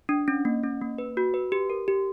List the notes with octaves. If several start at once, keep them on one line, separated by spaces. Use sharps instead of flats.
D4
C#4
A#3
C#4
A#3
B4
F#4
B4
G4
A#4
G4